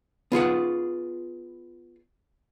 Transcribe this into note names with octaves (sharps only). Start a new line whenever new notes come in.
B3 F4 G#4 F#5